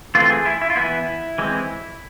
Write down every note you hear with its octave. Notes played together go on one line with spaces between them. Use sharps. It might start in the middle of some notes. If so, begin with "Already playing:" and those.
E3 A3 C4 F4
G#4
E4
E4
F4
E3 B3 E4
E3 G#3 C4